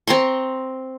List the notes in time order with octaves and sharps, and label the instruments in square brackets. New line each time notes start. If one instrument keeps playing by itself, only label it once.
[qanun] C4 A#5 C6 C#6